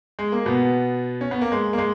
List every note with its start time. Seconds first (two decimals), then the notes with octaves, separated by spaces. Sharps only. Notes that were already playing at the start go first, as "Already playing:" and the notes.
0.19 G#3
0.32 A#3
0.46 B2 B3
1.21 C#4
1.31 B3
1.41 A#3
1.52 G#3
1.73 A#3
1.78 G#3